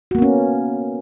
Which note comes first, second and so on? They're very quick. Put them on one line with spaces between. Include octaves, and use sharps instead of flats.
F#4 A#3 B3 C#4